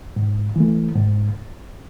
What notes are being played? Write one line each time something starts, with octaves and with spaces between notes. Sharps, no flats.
G#2
E3 A3
G#2